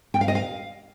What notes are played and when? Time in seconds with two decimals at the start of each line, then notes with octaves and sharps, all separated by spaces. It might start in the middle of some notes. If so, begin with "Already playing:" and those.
0.14 G5
0.21 F5
0.28 D#5
0.35 F5